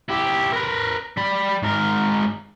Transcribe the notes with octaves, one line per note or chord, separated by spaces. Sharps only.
E4 G4
A#4 B4
G3 B5
G#2 A#4